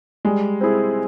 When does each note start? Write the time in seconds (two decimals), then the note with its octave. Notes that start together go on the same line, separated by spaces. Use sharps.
0.25 G3 G#3
0.61 C4 E4 G#4